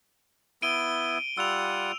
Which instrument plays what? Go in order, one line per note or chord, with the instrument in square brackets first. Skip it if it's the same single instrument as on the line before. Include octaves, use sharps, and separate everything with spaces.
[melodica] B3 E4 [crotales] D7 D#7 G7
[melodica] G3 F4 F#5 [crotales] E6 F7